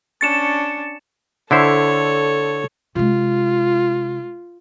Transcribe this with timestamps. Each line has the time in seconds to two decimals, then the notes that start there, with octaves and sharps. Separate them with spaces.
0.21 C#4 D4 A6 C#7 E7
1.51 D3 E4 A4 C5 C#5
2.96 C3 G#3 F4